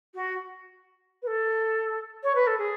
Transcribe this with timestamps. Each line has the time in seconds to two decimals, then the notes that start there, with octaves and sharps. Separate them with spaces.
0.14 F#4
1.22 B4
1.26 A4
2.23 C#5
2.35 B4
2.46 A4
2.58 G#4